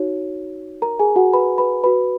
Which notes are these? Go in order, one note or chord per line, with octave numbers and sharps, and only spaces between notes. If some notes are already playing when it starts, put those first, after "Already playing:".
Already playing: D#4 F#4 C#5
A#4 A#5
G#4 G#5
F#4 F#5
B4 B5
B4 B5
F#4 B4 B5